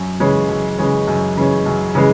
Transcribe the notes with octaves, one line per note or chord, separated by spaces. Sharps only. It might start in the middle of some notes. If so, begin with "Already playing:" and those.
Already playing: F#2
C#3 E3 G#3 C#4
F#2
C#3 E3 G#3 C#4
F#2
C#3 E3 G#3 C#4
F#2
C#3 E3 G#3